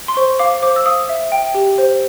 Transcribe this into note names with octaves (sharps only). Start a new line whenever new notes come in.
C6
C5 C#6
F5 D6
C5 D6
E6
F5 D#6
E5
G5
G4
C5